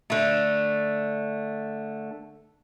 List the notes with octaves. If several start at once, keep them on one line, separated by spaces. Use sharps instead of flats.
D3 A3